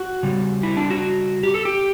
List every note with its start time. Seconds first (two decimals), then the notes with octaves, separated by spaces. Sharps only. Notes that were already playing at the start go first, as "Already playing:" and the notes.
Already playing: F#4
0.23 C#3 G3
0.63 E4
0.77 D4
0.90 F#4
1.43 G4
1.54 A4
1.65 G4